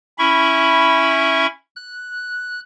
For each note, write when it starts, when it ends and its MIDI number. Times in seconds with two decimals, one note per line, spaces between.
0.19 1.47 61
0.19 1.47 64
0.19 1.47 76
0.19 1.47 83
0.19 1.47 85
1.76 2.60 90